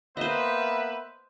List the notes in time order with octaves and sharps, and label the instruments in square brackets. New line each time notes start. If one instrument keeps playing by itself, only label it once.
[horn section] A#3 B3 B4 [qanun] C5 D#5 [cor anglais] E5